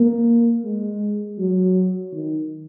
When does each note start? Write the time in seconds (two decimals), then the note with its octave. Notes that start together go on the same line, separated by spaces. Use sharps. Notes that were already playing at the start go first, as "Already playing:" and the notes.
Already playing: A#3
0.65 G#3
1.39 F#3
2.13 D#3